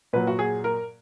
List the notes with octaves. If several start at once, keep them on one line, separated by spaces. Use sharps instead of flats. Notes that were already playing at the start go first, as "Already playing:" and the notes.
A#2 F#3 B4
F#4
G#4
A#4